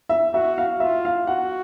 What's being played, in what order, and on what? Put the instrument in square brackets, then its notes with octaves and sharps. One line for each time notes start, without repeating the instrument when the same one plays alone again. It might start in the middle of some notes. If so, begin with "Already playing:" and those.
[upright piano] E5
[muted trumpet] F#4 [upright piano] E5
[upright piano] F5
[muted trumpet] F4 [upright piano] E5
[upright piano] F5
[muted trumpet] F#4 [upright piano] F#5